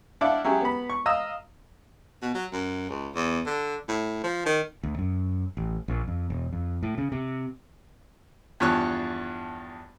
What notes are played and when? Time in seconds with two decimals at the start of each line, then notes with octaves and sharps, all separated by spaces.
0.21 D4 E4 D5 F5 F#5 D6
0.44 F#3 C#4 E4 G4 G#4
0.61 B3 B5
0.90 C#6
1.06 D#5 F5 A#5 D#6 E6
2.22 B2
2.34 F#3
2.53 F#2
2.89 C#2
3.15 E2
3.46 D3
3.88 A2
4.24 F3
4.46 D#3
4.83 D2
4.99 F#2
5.57 A1
5.88 A#1
6.08 F2
6.30 E1
6.53 F2
6.83 A2
6.98 C#3
7.12 C3
8.60 E2 G2 F3 C#5 A5 F#6